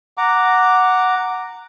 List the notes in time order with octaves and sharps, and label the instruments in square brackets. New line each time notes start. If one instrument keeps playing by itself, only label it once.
[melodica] F#5 A#5 D6